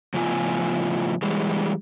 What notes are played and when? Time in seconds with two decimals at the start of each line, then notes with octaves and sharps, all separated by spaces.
0.14 A2 C#3 F3 B3 F4 G#5
1.22 E3 G3 G#3